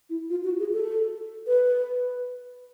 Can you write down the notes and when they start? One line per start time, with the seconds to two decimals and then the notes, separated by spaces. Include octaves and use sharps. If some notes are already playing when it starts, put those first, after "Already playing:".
0.10 E4
0.30 F4
0.44 F#4
0.60 G#4
0.73 A4
1.47 B4